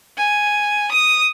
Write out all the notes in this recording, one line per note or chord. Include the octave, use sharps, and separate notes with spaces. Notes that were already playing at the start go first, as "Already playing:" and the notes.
G#5
D#6